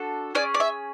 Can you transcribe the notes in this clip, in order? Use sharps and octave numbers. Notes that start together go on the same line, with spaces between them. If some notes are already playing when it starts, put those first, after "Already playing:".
Already playing: D4 F#4 A4
C#4 G#4 D5
D5
E5